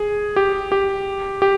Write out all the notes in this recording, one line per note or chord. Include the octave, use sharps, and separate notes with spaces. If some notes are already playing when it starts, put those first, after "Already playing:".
Already playing: G#4
G4
G4
G4